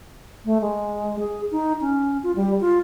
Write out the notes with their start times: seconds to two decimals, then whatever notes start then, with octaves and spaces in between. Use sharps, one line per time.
0.45 A3
0.61 G#3
1.19 G#4
1.51 D#4
1.81 C#4
2.23 F4
2.36 G3
2.61 F4